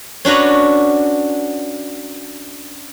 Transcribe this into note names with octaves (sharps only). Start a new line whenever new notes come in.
C#4 D4 F#4 B4 A#5